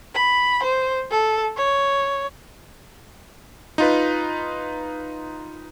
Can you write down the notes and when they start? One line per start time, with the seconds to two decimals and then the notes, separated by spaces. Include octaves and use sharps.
0.14 B5
0.63 C5
1.11 A4
1.57 C#5
3.78 D#4 F4 B4